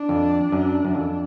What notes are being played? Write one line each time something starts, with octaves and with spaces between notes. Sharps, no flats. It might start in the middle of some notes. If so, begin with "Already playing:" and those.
Already playing: D4
F2
F#2
F#2
F2